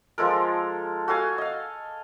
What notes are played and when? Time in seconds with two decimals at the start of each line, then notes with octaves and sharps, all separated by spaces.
0.18 F3 G#3 A4 A#4
1.08 F#4 A4 F5 G#5
1.38 D#5 F5